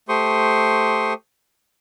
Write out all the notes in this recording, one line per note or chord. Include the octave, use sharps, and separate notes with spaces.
A3 G4 C5 C6 C#6 D#6